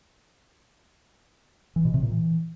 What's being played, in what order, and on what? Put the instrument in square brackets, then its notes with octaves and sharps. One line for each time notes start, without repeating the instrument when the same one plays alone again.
[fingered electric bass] E3
B2
C3
A#2
E3